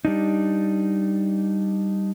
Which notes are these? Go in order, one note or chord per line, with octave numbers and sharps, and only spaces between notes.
G3 D4 D#4